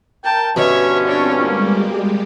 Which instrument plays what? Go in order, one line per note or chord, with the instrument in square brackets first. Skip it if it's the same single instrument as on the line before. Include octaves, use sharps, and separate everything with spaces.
[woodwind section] A#4 G5 [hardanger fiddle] A5
[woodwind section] G2 D3 C#4 [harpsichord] B2 [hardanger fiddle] C#5 E5
[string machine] C4 F4 [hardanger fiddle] D4 C#5
[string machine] G3 G#3 G4 [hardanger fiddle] A#3